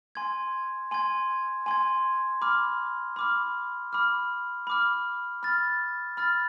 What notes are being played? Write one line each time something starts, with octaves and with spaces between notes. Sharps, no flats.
G#5 C6 G#6
G#5 C6 G#6
G#5 C6 G#6
B5 D6 F6
B5 D6 F6
B5 D6 F6
B5 D6 F6
B5 F6 A6
B5 F6 A6